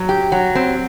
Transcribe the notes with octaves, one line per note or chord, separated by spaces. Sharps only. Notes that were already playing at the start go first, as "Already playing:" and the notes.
Already playing: F#3
G4
F#3
C4